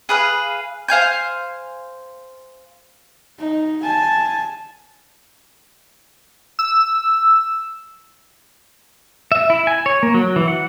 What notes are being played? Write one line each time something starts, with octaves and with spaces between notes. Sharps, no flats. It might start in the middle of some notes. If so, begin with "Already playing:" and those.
G#4 B4 F5
C5 F5 G#5 G6
D#4
G#5 A5
E6
E5
E4
G#5
C#5
A#3
F#3
E3
F#5